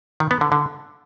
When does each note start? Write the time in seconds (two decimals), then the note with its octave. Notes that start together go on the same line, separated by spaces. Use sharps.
0.20 D#3
0.31 B3
0.41 D3
0.52 D3